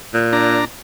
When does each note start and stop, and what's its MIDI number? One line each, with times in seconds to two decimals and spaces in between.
0.14 0.61 46
0.33 0.65 62
0.33 0.65 82